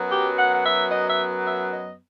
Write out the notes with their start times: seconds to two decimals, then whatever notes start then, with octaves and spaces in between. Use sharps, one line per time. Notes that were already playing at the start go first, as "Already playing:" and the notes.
Already playing: F#2 F#3 B3
0.10 G4
0.37 F#5
0.53 F#5
0.64 E5
0.91 D#5
1.08 E5
1.45 E5
1.72 D#5